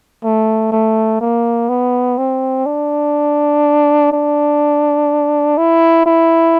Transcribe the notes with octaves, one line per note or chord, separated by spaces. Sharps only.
A3
A3
A#3
B3
C4
D4
D4
E4
E4